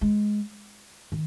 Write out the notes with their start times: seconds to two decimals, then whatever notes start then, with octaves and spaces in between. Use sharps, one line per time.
0.01 G#3
1.12 D#3